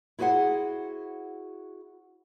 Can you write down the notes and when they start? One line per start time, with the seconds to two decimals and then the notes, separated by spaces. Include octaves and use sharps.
0.19 E4 F#4 G#4 C5 F#5